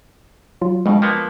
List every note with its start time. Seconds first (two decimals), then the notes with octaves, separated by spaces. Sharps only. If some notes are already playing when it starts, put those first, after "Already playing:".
0.61 F#3 F4
0.86 F2 B2 G#3 D4
1.02 F3 A#3 B3